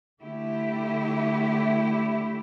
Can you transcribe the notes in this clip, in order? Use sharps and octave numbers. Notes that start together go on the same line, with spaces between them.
D3 A3 E4 G4